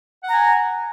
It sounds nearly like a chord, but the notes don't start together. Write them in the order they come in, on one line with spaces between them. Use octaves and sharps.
F#5 A#5 G#5